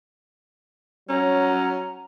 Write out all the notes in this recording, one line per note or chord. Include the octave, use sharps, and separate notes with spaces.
F#3 C#4 A#5